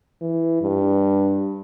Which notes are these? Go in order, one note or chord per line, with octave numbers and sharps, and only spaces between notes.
E3
G2